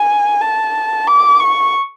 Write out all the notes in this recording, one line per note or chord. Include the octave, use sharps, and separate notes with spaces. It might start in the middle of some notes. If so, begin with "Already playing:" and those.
Already playing: G#5
A5
D6
C#6